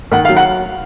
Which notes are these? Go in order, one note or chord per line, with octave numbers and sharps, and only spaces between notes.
D#3 F#5
F5
F#3
F#5